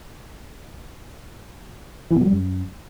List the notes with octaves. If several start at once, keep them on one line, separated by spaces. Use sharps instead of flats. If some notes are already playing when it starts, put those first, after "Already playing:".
E3
B2
F#3
G3
F#2